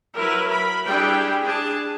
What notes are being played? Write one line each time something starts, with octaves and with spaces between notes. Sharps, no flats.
F#3 E4 A#4 B4
A#4 B5
G3 D4 E4 G4 G#4 G5
D4 G#4 A5